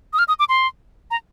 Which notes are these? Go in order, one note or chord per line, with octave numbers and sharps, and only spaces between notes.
D#6
F6
D#6
D6
C6
A#5